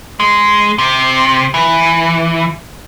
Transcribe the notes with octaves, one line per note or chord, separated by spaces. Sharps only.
G#3
C3
E3